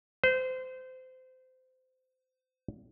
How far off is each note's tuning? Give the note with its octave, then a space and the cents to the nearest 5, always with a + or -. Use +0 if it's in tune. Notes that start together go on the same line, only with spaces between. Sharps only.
C5 -25